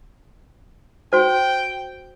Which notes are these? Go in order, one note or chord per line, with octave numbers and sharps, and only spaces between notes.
F#4 C5 G5